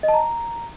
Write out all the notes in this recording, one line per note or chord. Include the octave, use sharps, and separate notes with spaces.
D#5
A5
A#5